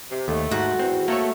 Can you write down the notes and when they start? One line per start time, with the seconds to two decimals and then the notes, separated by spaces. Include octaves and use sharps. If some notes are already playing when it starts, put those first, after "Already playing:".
0.11 C3
0.28 D#2 A3
0.51 G#2 F#4 F#5
0.79 E2 C4
1.08 A3 A#3 A4 C#5